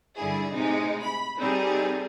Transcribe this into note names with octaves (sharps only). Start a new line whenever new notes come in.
G2 D3 E4 G#4
A2 C3 G#3 D#4
B5
C3 G3 C4 D#4 G#4 A4